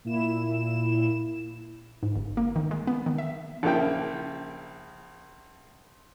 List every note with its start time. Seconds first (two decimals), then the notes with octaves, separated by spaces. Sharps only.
0.05 A#2 E4 E7
2.03 G#2
2.16 G1
2.37 A#3
2.56 D#3
2.71 G#3
2.87 B3
3.06 D#3
3.18 E5
3.63 A#1 C#3 A#3 E4 G5